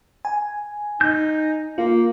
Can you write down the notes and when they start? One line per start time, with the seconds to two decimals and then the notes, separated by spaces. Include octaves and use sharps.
0.25 G#5
1.01 D#4 G6
1.78 A#3 F4